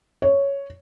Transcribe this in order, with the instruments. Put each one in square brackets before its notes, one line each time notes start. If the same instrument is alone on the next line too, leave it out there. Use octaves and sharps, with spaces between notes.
[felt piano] C#5